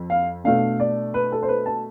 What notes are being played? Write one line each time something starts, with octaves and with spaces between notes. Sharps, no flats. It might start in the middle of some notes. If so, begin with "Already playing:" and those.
Already playing: F2
F5
B2 A3 D4 F5
D5
B4
A4
C5
B4
A5